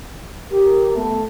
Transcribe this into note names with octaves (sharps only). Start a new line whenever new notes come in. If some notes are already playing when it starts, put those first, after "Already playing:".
G4 A#4
A3 B3